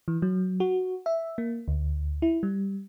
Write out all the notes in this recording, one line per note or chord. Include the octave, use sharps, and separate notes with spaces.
E3
F#3
F#4
E5
A#3
D2
E4
G3